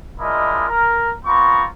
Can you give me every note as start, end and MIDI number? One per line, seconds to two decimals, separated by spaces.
0.20 0.66 56
0.20 0.66 62
0.20 0.66 64
0.20 0.66 65
0.20 0.66 70
0.20 0.66 75
0.69 1.12 70
1.25 1.64 59
1.25 1.64 60
1.25 1.64 65
1.25 1.64 82
1.25 1.64 85